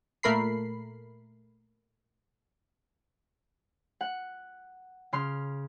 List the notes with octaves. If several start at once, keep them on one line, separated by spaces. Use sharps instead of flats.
A#2 A3 A#4 B5 C7
F#5
C#3 C6 F6